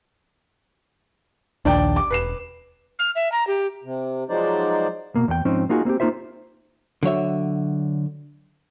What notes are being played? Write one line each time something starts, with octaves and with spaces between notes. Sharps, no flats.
A#1 D#2 D4 D5 G5
D6
E1 B4 C7 E7
F6
E5
A#5
G4
C3
F3 F#3 G#3 D#4 C5 D5
B2 A#3
E2 G5
G#2 F3 C4 C#4 D#4
A#3 D#4 F4 F#4 G#4
A#3 C4 D#4 G4
A#3 D#4 F4 C5 E5
D3 F#3 C#5 E5